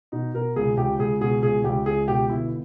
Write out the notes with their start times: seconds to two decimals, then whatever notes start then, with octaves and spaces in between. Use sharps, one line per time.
0.12 B2 D#4
0.34 B2 A#4
0.56 C#2 G#4
0.77 C#2 G4
0.99 C#2 G#4
1.21 B2 G#4
1.43 C#2 G#4
1.64 C#2 G4
1.86 C#2 G#4
2.08 B2 G4
2.29 G1 E4